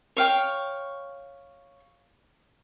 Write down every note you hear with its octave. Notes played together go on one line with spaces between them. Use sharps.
C#5 F5 G5